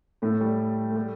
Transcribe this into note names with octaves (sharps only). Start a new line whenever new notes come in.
A2 A3
G3
A3
G3